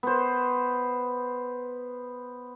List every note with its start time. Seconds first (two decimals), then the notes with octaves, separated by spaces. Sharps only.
0.03 B3 C5